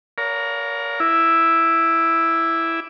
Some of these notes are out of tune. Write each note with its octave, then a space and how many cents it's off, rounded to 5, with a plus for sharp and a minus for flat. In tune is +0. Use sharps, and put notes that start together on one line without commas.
A#4 +0 C#5 +45 F5 +30
E4 +0 E5 +0 D6 +0